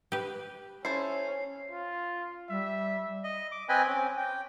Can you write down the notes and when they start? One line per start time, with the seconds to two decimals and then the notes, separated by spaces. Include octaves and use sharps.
0.12 G4 B4
0.85 C#4 E4 A4 C5 C7
1.71 F4
2.49 G3 E5
3.24 D#5
3.52 D6
3.69 C4 B4 D#5 G5 G#5 B5
3.88 C4 C#4 D6
4.17 G5